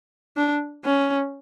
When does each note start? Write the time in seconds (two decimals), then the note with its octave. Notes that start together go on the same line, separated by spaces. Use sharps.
0.37 D4
0.85 C#4